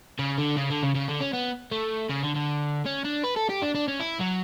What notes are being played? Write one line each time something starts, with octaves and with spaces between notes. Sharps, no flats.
C#3
D3
C#3
D3
C#3
C#3
D3
C#4
B3
A3
C#3
D3
D3
C#4
D4
B4
A4
G4
D4
D4
C#4
E4
F#3